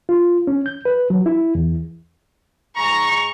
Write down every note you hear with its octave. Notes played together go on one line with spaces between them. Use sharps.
F4
C#4
G6
B4
F#3
E4
E2
G#2 A#5 C#6